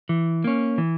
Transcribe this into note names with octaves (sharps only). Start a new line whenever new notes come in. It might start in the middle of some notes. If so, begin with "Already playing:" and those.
E3
A#3 C#4
E3